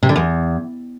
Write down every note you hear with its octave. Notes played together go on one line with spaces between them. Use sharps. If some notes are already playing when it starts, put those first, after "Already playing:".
C3
D3
E2